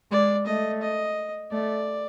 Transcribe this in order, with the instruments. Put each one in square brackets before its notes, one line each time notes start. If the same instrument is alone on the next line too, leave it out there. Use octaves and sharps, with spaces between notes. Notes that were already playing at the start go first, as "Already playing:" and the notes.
[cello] G#3 [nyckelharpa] D5
[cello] A3 [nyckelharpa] D#5
[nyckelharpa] D#5
[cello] A3 [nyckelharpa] D5